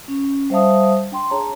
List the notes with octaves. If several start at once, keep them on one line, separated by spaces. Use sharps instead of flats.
C#4
G3 C5 E5 F5 A5 D#6
D4 G5 C6
D4 G#4 C#5 A5 A#5